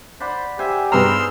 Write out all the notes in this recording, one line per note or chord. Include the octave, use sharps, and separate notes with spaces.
C5 D5 F#5 B5
G4 C5 E5 G#5
G2 G#3 B3 D#4 A#5 C6 E6 F6